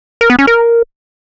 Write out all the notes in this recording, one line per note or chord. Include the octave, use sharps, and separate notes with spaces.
A#4
B3
C#4
A#4